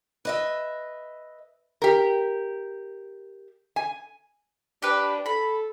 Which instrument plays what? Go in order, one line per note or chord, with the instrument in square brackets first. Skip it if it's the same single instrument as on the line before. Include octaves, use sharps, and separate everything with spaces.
[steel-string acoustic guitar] B4 D#5 E5
[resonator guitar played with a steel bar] G4 A#4
G#5
[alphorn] D4 [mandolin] G4 B4
[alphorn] A4 [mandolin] B5